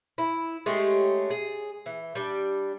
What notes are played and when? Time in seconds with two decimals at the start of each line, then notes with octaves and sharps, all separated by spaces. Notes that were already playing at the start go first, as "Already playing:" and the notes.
0.18 E4
0.66 G#3 A3 C#4 G4
1.30 G#4
1.86 E3
2.15 G3 D4